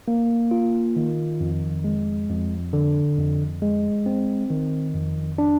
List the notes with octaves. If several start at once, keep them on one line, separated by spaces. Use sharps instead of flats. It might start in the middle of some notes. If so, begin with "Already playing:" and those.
A#3
F4
D#3
F2
G#3
F2
D3
F2
G#3
C4
D#3
F2
D4